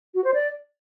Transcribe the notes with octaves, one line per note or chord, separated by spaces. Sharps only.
F#4
C5
D5